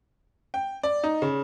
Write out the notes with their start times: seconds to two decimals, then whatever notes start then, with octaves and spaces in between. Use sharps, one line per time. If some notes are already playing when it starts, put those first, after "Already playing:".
0.54 G5
0.83 D5
1.03 D#4
1.22 C#3